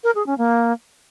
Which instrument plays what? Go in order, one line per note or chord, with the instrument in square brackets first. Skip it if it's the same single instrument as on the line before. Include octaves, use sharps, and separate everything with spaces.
[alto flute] A#4
G#4
C#4
A#3